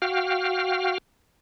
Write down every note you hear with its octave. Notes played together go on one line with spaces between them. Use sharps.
F#4 F5 G5 F6